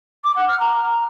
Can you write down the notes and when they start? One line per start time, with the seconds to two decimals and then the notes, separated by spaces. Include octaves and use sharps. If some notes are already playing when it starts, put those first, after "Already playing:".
0.24 D6
0.36 F#5
0.48 F6
0.60 A#5